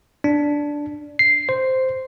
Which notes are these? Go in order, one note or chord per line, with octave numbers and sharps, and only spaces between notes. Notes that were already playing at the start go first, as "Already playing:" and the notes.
D4
C7
C5